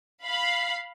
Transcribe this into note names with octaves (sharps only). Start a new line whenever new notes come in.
F5 B5